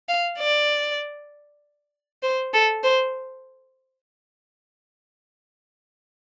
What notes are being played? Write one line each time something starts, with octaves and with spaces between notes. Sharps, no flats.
F5
D5
C5
A4
C5